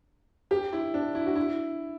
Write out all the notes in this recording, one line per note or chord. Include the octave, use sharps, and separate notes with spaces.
G4
E4
D4
E4
F#4
E4